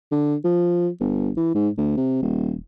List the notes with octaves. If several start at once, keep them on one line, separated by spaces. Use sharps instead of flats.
D3
F3
G1
E3
G#2
D2
C3
D#1